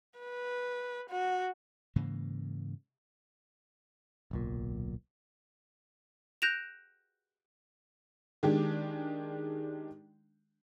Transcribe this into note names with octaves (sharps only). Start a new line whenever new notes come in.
B4
F#4
G#2 C#3 E3 A#3
D1 B1 A#2
F#6 G6 A#6 D7 E7 F7
D#3 G#3 D4 G4